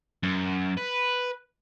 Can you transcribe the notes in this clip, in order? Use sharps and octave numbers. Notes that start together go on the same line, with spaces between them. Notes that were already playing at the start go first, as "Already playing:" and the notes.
F#2
B4